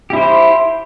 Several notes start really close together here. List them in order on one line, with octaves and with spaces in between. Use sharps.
G4 E4 C5